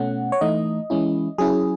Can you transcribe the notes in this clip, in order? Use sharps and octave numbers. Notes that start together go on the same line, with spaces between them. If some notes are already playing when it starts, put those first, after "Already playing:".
Already playing: B2 A3 C#4 F#5
C#5
E3 A3 D#4 D#5
E3 G#3 C#4 E4
F#3 C#4 E4 G#4